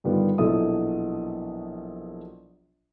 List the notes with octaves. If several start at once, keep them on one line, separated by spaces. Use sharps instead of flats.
G2 D3 D#3 G3 B3 F4
A#1 B2 F#3 E4 A4 D#6